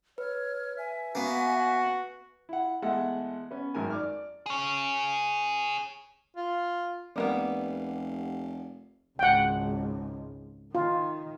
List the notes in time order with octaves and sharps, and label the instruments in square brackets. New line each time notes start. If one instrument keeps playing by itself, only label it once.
[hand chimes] B4 [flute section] C#5 F6
[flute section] E5 G#5
[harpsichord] A#3 B3 [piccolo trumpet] F#4
[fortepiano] E4 F#5
E2 G#3 A3 A4 F#5
B3 C#4
G#1 F#2 D#3 A#4 G#5
D5 D6 F6
[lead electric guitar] G#4 C#5
[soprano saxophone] F4
[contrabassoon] F1 [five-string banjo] G3 A#3 B3
[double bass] G#1 C#2 [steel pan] F#5 G5
[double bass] D#3 [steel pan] F4